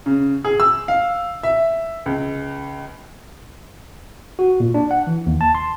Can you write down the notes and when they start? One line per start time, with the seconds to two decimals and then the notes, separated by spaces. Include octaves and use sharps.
0.06 C#3
0.45 G#4
0.60 E6
0.88 F5
1.43 E5
2.06 C#2
4.39 F#4
4.60 A#2
4.74 D4
4.91 F#5
5.07 E3
5.26 D#2
5.41 A5
5.55 C6